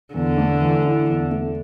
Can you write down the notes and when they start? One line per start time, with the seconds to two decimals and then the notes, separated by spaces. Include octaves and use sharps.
0.14 E2 D3
0.38 A3
0.61 E3
0.84 E4
1.09 E2
1.31 A3